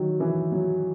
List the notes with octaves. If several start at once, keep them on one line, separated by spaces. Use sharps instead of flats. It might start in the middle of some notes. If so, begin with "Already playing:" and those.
Already playing: D#3 F#3
E3
F#3